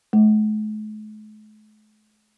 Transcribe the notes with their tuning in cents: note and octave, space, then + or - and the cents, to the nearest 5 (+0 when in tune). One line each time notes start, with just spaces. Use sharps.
A3 -45